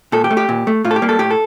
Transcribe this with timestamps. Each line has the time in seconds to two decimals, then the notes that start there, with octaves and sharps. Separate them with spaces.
0.12 A#2 A4
0.24 G4
0.31 A3
0.37 G4
0.49 A#2
0.67 A3
0.85 A2 F4
0.91 A4
0.96 G4
1.02 G3 A#3
1.09 A4
1.19 A2 G4
1.31 A4